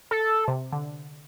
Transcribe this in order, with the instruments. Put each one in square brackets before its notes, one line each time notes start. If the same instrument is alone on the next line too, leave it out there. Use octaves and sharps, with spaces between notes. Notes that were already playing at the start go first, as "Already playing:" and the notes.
[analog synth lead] A4
[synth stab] C3
D3